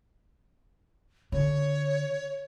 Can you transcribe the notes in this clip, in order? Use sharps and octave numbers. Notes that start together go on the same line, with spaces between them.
D3 C#5